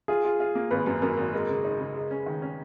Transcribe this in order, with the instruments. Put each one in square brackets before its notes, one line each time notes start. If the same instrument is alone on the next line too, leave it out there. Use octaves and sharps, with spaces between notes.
[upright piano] F4 [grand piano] G#4
[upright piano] F4
F4
A#3
[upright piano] G#1 [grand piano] B4
[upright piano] F#2
[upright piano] F#2 [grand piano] A#4
[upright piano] G#1
[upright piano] G#3 [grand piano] A#4
[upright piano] C#3
D#4
C#3
G#3
C#4
D#3
C#4